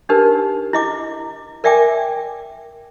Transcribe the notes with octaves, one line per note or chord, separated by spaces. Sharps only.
D4 D#4 G4 A#4 B4
E4 D#5 D6
A#4 D5 E5 G5 G#5 D6